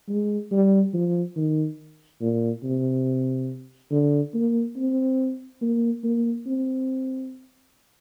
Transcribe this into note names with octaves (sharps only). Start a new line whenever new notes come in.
G#3
G3
F3
D#3
A#2
C3
D3
A#3
C4
A#3
A#3
C4